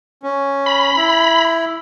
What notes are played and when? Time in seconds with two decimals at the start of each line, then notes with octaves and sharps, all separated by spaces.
0.23 C#4
0.66 B5
0.97 E4